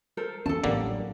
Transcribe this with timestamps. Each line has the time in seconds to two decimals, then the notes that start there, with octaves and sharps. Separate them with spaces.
0.17 A4 A#4 C5
0.46 F2 E3 C4 C#4 A4 A5
0.64 A1 D3 F#3 G3 A#3 A#4 C#5 F#5